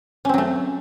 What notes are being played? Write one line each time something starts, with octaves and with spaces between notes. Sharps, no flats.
F#3 A3 C4 C#4